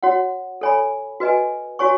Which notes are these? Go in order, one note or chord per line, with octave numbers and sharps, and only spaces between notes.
F#4 C#5 F#5
A4 C#5 G#5 B5
F#4 B4 D#5 G#5
F#4 C#5 G#5 C#6